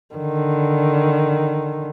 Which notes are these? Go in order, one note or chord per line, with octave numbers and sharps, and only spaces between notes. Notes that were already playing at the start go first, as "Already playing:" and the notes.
D3 D#3